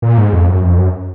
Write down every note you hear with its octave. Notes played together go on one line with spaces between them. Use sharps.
A#2
G#2
F2
F#2
F2
F#2